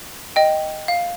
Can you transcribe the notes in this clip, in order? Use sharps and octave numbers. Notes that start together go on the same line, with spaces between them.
D#5 G5
F5